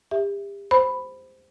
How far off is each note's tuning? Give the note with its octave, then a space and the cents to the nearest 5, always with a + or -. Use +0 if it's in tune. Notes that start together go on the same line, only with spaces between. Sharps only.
G4 +35 E5 +0
C5 -10 B5 +5